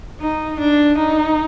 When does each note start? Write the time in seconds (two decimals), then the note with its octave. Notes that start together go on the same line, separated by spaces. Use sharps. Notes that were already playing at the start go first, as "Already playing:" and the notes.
0.20 D#4
0.60 D4
0.98 D#4